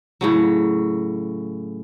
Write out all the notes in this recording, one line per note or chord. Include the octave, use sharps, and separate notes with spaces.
A2 C#3 F#3